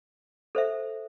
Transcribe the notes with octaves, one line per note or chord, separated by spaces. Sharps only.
A4 C5 E5